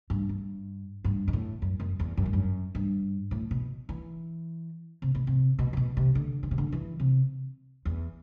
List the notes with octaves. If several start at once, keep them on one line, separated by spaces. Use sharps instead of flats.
G2
G2
G2
G2
A2
F#2
F#2
E2
F#2
G2
F#2
G2
A2
B2
E3
C3
B2
C3
B2
A2
B2
C3
D3
D3
C3
D3
E3
C3
E2